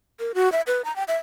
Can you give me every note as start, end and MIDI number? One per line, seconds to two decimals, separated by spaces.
0.20 0.32 70
0.35 0.51 66
0.52 0.61 76
0.67 0.82 71
0.85 0.94 82
0.96 1.03 79
1.08 1.16 76